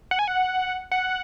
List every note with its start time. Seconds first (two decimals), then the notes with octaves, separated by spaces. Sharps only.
0.11 F#5
0.19 G#5
0.28 F#5
0.92 F#5